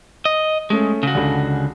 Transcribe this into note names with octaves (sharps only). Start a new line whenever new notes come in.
D#5
G#3 A3 C#4 A4
C#3 F#4
C#2 D3